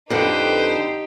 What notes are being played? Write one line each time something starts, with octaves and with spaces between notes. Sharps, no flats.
F2 D3 D#4 G4 B4 C5